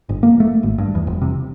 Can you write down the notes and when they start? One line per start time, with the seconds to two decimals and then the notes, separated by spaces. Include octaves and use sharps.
0.09 G1
0.23 A#3
0.40 A3
0.63 G#1
0.78 G2
0.95 E2
1.07 F1
1.22 C3